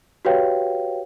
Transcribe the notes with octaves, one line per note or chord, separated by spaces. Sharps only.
F#4 G4 B4 C#5 F5 G5